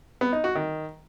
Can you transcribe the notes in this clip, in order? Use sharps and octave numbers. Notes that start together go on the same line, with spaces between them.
B3
D#4
F#4
D#3